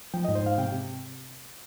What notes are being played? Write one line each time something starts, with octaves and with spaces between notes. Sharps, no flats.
F3 G5
D#5
G#2
C5
G#2 F5
C3 G5
C3